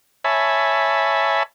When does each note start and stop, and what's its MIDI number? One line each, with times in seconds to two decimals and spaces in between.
0.24 1.43 73
0.24 1.43 76
0.24 1.43 80
0.24 1.43 81
0.24 1.43 83